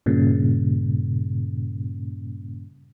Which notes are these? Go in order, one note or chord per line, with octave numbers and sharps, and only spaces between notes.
G2 A#2 C#3